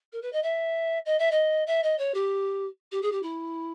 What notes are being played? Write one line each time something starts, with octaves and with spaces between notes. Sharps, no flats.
A#4
B4
D#5
E5
D#5
E5
D#5
E5
D#5
C#5
G4
G4
G#4
G4
E4